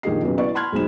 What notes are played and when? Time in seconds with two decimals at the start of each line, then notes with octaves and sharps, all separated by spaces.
0.03 A#1 D#3 G4 G#4 D#5 C7
0.23 B1 C#3 B4
0.37 B3 E4 D5 C#6
0.55 A5 B5 C6 F6 F#6 G#6
0.72 B1 G#3 D#4 C5 B5 E7